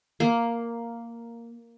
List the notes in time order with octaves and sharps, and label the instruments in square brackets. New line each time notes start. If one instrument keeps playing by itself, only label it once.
[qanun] A#3